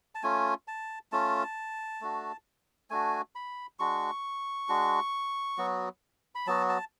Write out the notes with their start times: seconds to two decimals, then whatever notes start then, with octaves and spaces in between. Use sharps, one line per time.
0.15 A5
0.23 A3 C#4 F4 G#5
0.68 A5
1.12 A3 C#4 F4 A5
2.01 A3 D4 F#4
2.90 A3 D4 F#4 G#5
3.35 B5
3.79 G#3 D4 F#4 C#6
4.69 G#3 D4 F#4
5.58 F#3 B3 F#4
6.35 B5
6.47 F#3 B3 F#4 A5
6.69 A5